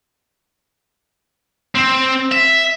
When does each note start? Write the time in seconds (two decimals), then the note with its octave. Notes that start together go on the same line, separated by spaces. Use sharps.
1.75 C4
2.32 E5